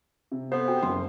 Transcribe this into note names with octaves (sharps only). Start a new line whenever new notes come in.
C3
B3 A4 C5
F#4 G4 G5
F#1 F#2 C6